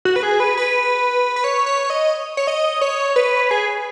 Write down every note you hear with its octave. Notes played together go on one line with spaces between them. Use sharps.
F#4
B4
G#4
B4
B4
B4
C#5
C#5
D#5
C#5
D#5
C#5
B4
G#4